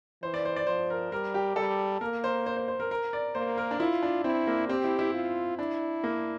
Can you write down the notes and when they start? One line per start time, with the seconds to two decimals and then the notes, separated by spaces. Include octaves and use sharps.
0.23 E3 C5
0.34 D5
0.45 C5
0.56 D5
0.67 F3 C5
0.90 A#4
1.12 G3 A#4
1.34 G4
1.56 G3 A4
2.01 A#3 A#4
2.24 C5
2.46 C5
2.57 C5
2.68 C5
2.80 A#4
2.91 A#4
3.13 D5
3.35 A#3 C5
3.58 A#4
3.71 D4
3.80 E4 F4
4.03 D4
4.24 C4 E4
4.47 A#3
4.69 C4 G4
4.84 E4
4.99 E4
5.14 F4
5.58 D4 E4
6.04 A#3